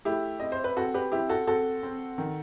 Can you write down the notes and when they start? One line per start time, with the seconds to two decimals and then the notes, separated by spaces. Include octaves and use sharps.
0.05 A3 E4 G4
0.40 C4 D#5
0.52 C5
0.64 B4
0.76 C4 F#4 A4
0.94 G4 B4
1.12 C4 E4 G4
1.29 F#4 A4
1.47 C4 F#4 A4
1.83 C4
2.18 D#3